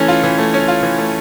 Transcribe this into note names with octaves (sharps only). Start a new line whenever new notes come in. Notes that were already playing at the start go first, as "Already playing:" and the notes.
Already playing: E3 A3 C#4
F4
E3
A3
C#4
F4
E3
A3